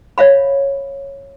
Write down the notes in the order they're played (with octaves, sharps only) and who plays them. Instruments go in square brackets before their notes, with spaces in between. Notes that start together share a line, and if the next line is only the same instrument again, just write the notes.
[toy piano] C#5 E5 F5 B5